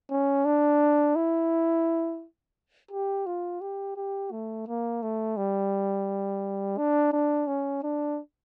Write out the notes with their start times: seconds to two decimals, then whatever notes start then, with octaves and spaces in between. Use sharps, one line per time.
0.10 C#4
0.45 D4
1.15 E4
2.91 G4
3.26 F4
3.61 G4
3.96 G4
4.31 A3
4.67 A#3
5.02 A3
5.37 G3
6.77 D4
7.12 D4
7.47 C#4
7.83 D4